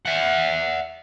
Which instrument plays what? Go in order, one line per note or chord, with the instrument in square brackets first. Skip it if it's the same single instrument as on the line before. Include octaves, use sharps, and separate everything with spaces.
[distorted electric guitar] E5 F#5